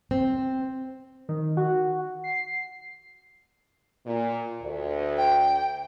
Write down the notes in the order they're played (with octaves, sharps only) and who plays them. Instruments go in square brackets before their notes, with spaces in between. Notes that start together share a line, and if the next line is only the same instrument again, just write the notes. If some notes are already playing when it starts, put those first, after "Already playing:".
[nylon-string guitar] C4
[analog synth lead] D#3
F#4
C7
[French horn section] A#2
D2
[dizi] G5